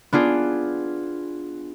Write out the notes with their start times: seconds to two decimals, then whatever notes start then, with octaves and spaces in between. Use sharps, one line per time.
0.13 B3 D4 F4 G#4